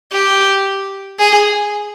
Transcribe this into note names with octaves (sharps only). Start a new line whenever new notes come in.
G4
G#4